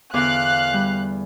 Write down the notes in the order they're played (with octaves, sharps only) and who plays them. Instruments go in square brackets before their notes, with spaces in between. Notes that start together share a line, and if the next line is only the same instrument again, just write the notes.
[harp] E2 D3 D6 [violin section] F5 F#6
[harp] G3